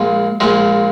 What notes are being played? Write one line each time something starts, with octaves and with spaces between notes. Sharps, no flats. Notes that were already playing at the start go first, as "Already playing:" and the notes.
Already playing: A#1 A#2 G#3
A#1 A#2 G#3